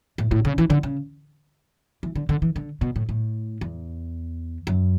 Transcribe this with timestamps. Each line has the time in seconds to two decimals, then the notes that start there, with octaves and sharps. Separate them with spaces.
0.18 A2
0.31 A2
0.45 C#3
0.58 E3
0.70 D3
0.83 C#3
2.03 E3
2.15 D3
2.29 D3
2.42 E3
2.56 D3
2.81 B2
2.96 A2
3.09 A2
3.61 E2
4.67 F#2